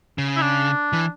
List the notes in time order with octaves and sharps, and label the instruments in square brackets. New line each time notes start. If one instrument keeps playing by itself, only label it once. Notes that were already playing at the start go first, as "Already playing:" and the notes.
[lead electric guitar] C#3
[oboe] E4
D4
[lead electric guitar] E3